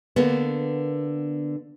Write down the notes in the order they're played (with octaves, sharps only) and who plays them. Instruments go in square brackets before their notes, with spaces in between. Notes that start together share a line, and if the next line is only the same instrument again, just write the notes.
[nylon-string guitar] D3 A#3 B3